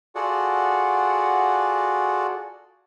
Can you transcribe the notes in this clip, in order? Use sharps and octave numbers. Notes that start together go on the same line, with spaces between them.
F4 F#4 G#4 A4 D5 F#5